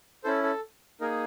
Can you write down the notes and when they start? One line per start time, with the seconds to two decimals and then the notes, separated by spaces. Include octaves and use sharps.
0.24 C#4 E4 A4 C5
0.43 A4
1.01 A#3 D#4 G#4 A#4